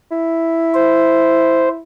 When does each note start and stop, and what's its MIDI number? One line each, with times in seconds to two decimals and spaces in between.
0.11 1.80 64
0.74 1.69 72